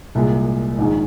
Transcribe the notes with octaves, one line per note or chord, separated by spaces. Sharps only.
C2 A#2 G#3
A#1 G#2 D#3 G#3